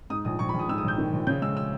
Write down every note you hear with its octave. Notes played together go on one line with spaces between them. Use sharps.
G#2 D#6
A#1 D#6
A#1 C#6
B5
A#1
D#6
G#2 E6
D#6
A#1 G6
D#3
A#1
C#3 G6
G#3 E6
E6